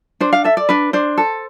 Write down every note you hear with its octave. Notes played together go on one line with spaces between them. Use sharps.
D4 C5
F5
A4 E5
D5
D4 B4
D4 C5
A4